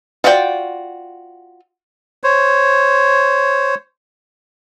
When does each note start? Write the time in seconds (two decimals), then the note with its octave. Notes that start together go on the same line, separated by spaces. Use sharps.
0.24 F4 F#4 D5 D#5 G5
2.24 C5 C#5